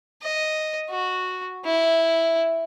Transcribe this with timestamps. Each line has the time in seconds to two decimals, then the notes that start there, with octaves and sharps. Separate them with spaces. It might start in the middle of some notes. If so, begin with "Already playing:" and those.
0.23 D#5
0.90 F#4
1.65 E4